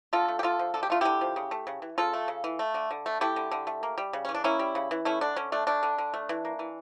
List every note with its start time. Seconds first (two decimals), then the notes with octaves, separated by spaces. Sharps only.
0.13 D3 F4 A4
0.28 A3
0.39 G4
0.43 D3 F4 A4
0.59 F3
0.74 D3 A4
0.83 G4
0.90 A3 F4
1.01 D3 E4 G4
1.21 F3
1.36 C#3
1.51 A3
1.67 C#3
1.82 E3
1.98 C#3 F4 A4
2.13 A3
2.28 C#3
2.44 E3
2.59 A3
2.74 D3
2.91 D3
3.06 A3
3.21 A3 E4 G4
3.36 D3
3.51 D3
3.67 A3
3.83 A#3
3.98 G3
4.13 C#3
4.25 E3 C#4
4.35 D4
4.44 A#3 C#4 E4
4.59 G3
4.75 C#3
4.91 E3
5.05 A3 C#4 E4
5.21 D3 D4
5.36 D3 C#4
5.52 A3 D4
5.67 A3 D4
5.83 D3
5.98 D3
6.14 A3
6.29 E3
6.45 A#3
6.59 E3